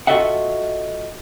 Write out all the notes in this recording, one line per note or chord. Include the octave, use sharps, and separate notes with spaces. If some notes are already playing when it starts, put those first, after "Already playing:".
F4 F#4 A4 D#5 E5 F#5